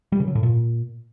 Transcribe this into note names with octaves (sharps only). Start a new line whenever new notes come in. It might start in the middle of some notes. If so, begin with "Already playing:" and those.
G3
C#3
F#3
A2
A#2